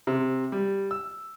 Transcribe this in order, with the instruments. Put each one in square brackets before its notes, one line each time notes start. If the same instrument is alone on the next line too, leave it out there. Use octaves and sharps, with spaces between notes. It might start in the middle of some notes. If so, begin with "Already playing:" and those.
[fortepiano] C3
G3
E6